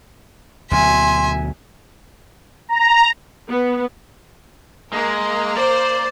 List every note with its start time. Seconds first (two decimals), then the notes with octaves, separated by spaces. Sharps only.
0.71 D2 B2 F#3 E5 G#5 C6
2.69 A#5
3.50 B3
4.93 G#3 A#3 A#4
5.57 C5 D5